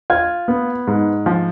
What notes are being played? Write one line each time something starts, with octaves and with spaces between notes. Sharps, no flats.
F4 G#6
B3
G#2
F3